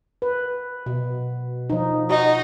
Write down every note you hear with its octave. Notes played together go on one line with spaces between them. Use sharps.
B4
B2
F3 D#4
D#4 F#4